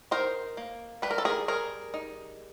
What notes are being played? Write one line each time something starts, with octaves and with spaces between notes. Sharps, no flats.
D#4 A#4 C5
A#3
G3 B4
A#4
A4
G#4 A#4
G3 G#4 A#4
D#4